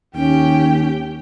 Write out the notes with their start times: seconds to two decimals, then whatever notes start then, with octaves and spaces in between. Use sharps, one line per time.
0.15 D#2 C#4 G4 G5